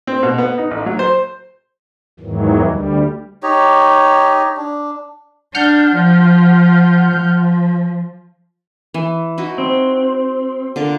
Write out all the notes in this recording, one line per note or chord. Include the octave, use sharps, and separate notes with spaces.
C4
B2
B3
D#4
A1
F#3
C5
E2 G#2 D#3 E3 F#3
D2 G3
D#4 G4 C#5
D4
D4 F#5 F6 G6
F3
F3
E3
D#4 E4 F#4
C4
D3 F4 A#4